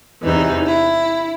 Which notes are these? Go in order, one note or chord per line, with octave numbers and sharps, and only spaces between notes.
E2 C3 E3 D#4
E4